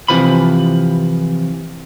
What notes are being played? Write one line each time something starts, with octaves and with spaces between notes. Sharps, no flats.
C3 E3 F3 B5